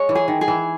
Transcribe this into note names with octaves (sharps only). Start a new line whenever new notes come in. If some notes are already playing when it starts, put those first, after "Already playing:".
Already playing: G#3 C#5
E3
G#4
D#3
G#4
E3